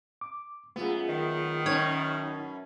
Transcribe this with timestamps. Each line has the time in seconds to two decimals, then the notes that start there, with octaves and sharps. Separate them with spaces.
0.21 D6
0.76 F#2 A3 B3 F4 G#4
1.09 D#3
1.66 F#2 B2 C#4 D#4 C#5